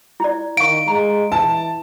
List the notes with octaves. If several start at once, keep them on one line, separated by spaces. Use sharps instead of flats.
E4 D5
D#3 F5 C#6 D7
G#3 A#5
E3 A5